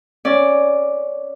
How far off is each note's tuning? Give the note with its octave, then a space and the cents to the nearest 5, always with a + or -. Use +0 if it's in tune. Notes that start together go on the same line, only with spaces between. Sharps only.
C#4 +0 D5 +0